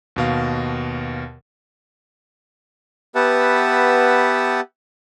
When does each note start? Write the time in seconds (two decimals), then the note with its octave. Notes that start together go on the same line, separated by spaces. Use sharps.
0.16 D#2 B2 F5
3.15 B3 G4 B4 E5 F#5 A5